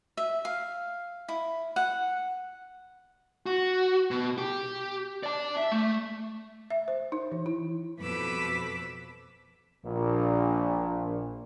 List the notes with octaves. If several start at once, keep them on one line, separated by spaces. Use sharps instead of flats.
E5
F5
E4
F#5
F#4
B2
G4
D5 A5
E5
A3
E5
C5
D#4
E3
E4
F2 B2 B4 B5 D6 E6
A#1 A#2